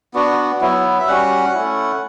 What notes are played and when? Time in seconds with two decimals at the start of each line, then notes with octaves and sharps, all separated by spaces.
0.14 B3 D4 F#4
0.61 F#3 B3 E4
0.99 E5
1.07 G3 C#4 F#4 F#5
1.54 A3 C#4 E4